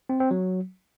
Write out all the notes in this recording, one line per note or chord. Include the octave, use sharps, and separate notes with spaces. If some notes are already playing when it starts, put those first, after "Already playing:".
C4
C4
F#3